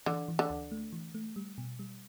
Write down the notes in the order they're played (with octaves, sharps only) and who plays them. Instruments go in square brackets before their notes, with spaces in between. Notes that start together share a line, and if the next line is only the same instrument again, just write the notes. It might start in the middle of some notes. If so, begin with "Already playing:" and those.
[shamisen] D3 [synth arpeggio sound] E3
[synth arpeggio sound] E3
[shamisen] D3
[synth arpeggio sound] D2
A3
E3
A3
G3
B2
G3